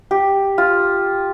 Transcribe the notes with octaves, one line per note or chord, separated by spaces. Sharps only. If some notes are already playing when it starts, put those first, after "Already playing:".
G4
F4